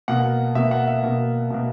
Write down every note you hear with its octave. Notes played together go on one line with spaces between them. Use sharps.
B2 A#3 F#5
B2 A#3 E5
F#5
E5
B2 A#3
B2 A#3